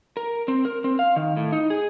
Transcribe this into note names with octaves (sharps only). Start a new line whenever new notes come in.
A#4
C4
A#4
C4
F5
D#3
A2
D#4
G#4